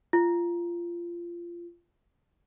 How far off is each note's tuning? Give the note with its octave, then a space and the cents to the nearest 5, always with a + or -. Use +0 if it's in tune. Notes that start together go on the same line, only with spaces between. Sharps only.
F4 -20